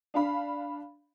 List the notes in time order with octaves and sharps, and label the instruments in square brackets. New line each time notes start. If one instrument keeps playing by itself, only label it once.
[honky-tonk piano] D4 F5 B5